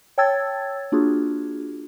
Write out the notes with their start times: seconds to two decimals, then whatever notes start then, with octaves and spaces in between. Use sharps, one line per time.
0.18 C#5 G5 A5 E6 G#6 A6
0.92 A#3 D4 F4 F#4 G#4